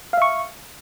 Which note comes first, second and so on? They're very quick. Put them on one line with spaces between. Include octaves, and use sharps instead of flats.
F5 E5 C#6